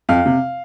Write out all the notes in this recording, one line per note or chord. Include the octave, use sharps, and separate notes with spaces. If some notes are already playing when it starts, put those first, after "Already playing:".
F2 F5
C3